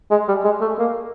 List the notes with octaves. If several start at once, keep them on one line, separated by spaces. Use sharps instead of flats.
G#3
G3
G#3
A3
A#3